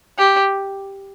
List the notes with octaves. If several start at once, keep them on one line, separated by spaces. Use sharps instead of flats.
G4